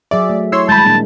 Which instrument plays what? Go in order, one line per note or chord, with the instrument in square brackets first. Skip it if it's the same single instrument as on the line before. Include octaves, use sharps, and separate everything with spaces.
[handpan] F#3 G#4 E5 [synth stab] D5
[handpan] A3
[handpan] E4 [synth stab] C#5 C6 E6
[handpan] D#3 G3 G#3 [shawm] A5 [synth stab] B5 G6
[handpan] A#2 A#3 D4